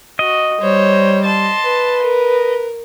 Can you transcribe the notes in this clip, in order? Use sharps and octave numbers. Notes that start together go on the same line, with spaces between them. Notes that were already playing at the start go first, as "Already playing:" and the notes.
F#4 D#5
G3 C5 C#5
A5 C6
B4
A#4